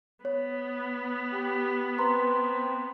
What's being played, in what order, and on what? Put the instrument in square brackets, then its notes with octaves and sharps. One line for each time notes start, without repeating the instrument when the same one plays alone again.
[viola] B3 [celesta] C#5
[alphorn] G4
[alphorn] C4 [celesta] B4 A#5 C6